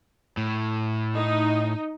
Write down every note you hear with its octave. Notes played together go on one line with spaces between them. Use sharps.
A2
D#4